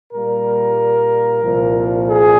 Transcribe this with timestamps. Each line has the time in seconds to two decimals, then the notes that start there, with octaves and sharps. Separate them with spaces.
0.13 A#2 G3 A#3 A#4
1.43 C2 A#2 F3
2.08 G#4